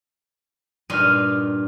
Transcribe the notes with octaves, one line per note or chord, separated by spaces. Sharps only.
G2 A#2 D#4 F6 D#7